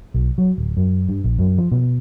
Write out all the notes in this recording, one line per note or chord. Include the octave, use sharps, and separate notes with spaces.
B1
F#3
D1
F#2
G2
A#1
F#2
F3
B2